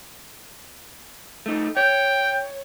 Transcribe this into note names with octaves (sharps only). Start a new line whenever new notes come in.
A3 D#4
C#5 G5